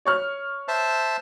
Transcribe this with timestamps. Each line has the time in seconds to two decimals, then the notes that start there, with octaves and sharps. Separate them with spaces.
0.05 C#5 C#6 F6
0.68 C5 E5 A5